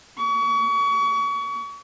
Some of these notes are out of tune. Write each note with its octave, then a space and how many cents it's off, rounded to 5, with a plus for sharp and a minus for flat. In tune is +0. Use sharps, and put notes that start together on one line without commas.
C#6 +35